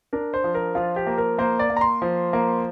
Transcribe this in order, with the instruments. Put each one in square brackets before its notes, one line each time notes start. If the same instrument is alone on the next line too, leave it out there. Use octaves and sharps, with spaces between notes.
[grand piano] D4 A#4
C5
F3
A#4
F3 F4
G4
A#3
A#4
A#3 C5
D5
A#3
A#5
C6
F3
A#3